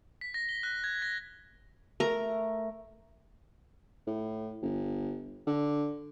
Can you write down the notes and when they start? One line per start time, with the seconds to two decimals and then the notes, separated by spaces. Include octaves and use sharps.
0.21 B6
0.34 A#6
0.49 G7
0.63 F#6
0.84 G#6
1.02 A#6
2.00 A3 A#4 A#5
4.07 A2
4.63 G1
5.47 D3